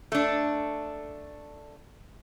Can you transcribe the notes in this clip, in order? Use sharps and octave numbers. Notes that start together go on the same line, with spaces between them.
A3 D4